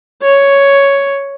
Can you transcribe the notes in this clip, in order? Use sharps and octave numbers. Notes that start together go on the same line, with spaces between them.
C#5